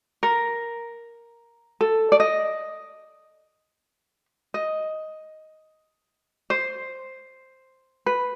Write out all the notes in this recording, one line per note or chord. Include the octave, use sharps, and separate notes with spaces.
A#4
A4
D5
D#5
D#5
C5
B4